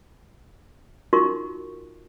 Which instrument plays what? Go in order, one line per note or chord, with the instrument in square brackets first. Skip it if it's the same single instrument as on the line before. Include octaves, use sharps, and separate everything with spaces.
[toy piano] D#4 F4 F#4 A#4 C6 C#6